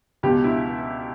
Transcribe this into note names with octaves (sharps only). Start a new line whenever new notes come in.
C#2 B2 G4
E4